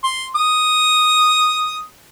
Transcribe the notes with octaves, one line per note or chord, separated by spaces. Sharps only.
C6
D#6